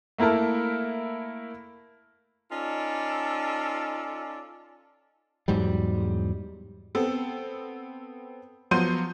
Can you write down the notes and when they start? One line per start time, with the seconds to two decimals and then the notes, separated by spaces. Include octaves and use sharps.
0.18 A3 A#3 E4 A#4 A5
2.51 C#4 D#4 F4 A4 D5
5.48 E2 G#2 F#3 G3
6.95 B3 C4 A4
8.71 F3 F#3 B3 C6 G6 D#7